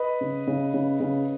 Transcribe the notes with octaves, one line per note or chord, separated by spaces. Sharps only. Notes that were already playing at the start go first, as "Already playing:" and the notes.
Already playing: B4 D#5
C#3
C#3
C#3
C#3